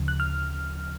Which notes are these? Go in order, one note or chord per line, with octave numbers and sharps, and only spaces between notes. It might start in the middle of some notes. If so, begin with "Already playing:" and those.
Already playing: D2 C#3 F3
F#6
F6